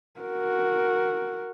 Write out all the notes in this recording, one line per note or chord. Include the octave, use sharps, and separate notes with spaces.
F#4 A#4